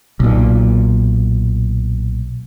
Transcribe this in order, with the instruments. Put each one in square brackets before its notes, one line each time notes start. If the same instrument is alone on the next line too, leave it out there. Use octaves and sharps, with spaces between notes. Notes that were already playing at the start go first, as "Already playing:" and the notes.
[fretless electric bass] B1 A#2